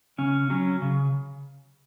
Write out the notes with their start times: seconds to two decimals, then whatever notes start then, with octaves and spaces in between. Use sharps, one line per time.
0.18 C#3 C#4
0.50 F#3 C#4
0.82 C#3